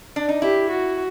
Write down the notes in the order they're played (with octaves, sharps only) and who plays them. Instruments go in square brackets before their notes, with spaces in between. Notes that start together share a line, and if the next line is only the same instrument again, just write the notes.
[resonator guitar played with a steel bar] D4
D#4
[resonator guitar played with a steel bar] E4 [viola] G4
[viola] F#4